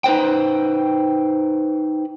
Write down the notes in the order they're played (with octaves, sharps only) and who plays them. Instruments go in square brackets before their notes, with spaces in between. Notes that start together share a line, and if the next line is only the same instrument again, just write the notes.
[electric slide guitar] D#4 B4 C5 G5